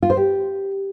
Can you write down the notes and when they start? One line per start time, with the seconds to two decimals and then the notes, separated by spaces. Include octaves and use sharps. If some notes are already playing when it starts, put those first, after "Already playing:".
0.02 F4
0.10 C5
0.17 G4